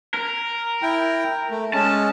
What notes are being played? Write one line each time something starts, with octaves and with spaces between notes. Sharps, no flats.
A#4
E4 G5
A3
G#3 C#4 A5